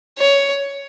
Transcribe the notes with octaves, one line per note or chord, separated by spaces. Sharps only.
C#5